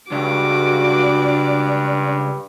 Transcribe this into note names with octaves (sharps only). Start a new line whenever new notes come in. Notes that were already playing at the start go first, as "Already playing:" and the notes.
C#2 G2 D4 F#4 D6